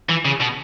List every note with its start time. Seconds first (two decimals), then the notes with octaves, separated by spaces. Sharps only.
0.09 E3
0.25 C#3
0.40 B2